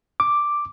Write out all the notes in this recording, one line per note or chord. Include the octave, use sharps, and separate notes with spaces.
D6